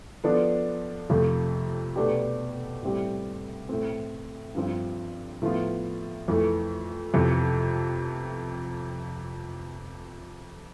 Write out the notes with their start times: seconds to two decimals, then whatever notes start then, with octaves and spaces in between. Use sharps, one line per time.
0.24 F3 B3 D4 A4
1.10 F2 C3 F3 A3
1.96 B2 A3 D4 G4
2.83 A2 G3 C4 G4
3.69 A2 E3 A3 C4
4.55 G2 F3 C4 F4
5.42 A2 F3 B3 F4
6.28 F2 E3 A3 E4
7.14 F2 C3 E3